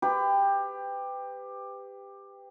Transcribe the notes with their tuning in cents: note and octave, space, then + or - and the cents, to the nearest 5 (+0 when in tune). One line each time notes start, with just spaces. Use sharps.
G4 +15 B4 +30